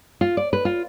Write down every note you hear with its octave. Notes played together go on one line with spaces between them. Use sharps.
F4
D5
B4
F4